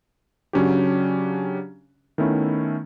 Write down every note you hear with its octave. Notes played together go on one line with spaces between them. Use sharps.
C#3 F#3 C#4 D4 F#4 G4
D#3 A3 B3 C#4 E4